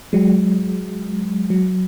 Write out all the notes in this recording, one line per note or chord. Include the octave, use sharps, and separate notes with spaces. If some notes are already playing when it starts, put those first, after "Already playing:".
F#3 G#3
F#3